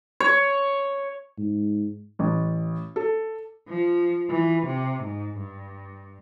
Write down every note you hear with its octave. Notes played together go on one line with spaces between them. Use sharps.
C#5
G#2
A1
A4
F3
E3
C3
G#2
G2